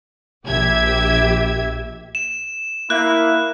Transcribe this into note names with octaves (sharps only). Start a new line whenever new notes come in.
A#1 G4 E5 G#6
E7
A#3 E4 F#6